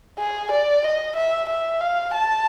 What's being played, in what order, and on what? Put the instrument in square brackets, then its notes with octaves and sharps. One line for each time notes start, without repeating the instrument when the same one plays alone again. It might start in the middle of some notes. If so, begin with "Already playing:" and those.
[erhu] G#4
D5
D#5
E5
E5
F5
A5